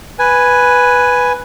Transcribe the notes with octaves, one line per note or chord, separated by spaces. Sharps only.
B4 G#5